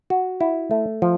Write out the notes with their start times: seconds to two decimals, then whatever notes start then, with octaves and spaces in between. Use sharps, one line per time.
0.10 F#4
0.41 E4
0.71 A3
1.02 F3